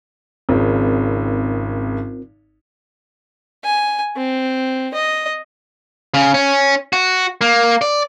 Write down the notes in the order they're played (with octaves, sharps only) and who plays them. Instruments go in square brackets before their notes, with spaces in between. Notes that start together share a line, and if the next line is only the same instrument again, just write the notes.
[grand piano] G#1 C#3 [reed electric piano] C4 F4 A#4
[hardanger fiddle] G#5
C4
D#5
[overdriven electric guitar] C#3
C#4
F#4
A#3
D5